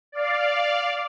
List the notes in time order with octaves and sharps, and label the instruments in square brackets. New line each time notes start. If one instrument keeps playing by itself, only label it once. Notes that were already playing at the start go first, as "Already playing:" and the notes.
[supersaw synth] D5 F5